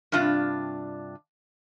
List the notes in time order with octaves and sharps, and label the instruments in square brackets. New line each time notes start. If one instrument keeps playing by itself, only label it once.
[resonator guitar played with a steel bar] G2 C3 D4 F4